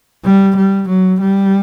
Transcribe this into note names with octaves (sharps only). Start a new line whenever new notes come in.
G3
G3
F#3
G3